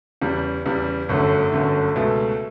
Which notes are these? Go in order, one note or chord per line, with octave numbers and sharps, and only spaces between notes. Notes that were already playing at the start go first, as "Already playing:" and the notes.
E2 C#3 G3
E2 C#3 G3
G1 F#2 D3 A3
G1 F#2 D3 A3
C#2 B2 A3